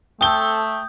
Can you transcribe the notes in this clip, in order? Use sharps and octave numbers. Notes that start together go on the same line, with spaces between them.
A3 C4 A4 G5 D#6 G6 G7